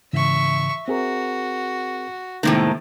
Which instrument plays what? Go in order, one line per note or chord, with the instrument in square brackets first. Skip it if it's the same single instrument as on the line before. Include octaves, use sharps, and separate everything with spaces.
[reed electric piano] G#2 C#3 E3 [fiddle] E5 C#6
[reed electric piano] C4 G#4 A#4 [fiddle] F#4
[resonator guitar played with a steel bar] A2 C3 D#3 [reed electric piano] G#3 A#3